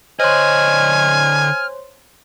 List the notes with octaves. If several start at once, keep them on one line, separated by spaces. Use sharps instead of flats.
D3 C5 C#5 D#5 G#5 C6 F6